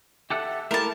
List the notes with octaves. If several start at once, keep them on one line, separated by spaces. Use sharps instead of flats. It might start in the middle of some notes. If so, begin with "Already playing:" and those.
G4 A4 E5 F#5
A3 E4 G4 A#4 A5